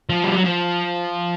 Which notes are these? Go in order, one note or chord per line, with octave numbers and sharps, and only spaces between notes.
F3
G3
F#3
F3